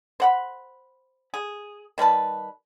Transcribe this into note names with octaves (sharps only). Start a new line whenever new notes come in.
C5 F#5 B5
G#4
D#3 G3 B4 A5